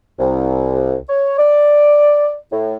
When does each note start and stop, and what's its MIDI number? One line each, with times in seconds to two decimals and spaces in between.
0.19 0.96 36
1.09 1.35 73
1.38 2.37 74
2.52 2.76 45